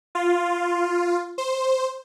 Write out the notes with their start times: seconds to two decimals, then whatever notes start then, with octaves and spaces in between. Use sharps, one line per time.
0.15 F4
1.38 C5